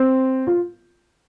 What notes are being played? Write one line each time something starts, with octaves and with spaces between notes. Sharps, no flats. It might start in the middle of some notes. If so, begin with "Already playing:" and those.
Already playing: C4
F4